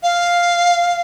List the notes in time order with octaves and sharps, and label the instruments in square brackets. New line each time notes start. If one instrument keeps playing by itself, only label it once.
[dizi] F5